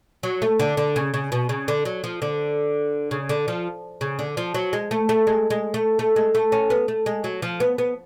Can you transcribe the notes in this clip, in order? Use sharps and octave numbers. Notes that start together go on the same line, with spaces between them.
F#3
A3
D3
D3
C#3
C#3
B2
C#3
D3
F#3
F3
D3
C#3
D3
F3
C#3
D3
F3
F#3
G#3
A3
A3
G#3
G#3
A3
A3
G#3
A3
C#4
B3
A3
G#3
F#3
F3
B3
B3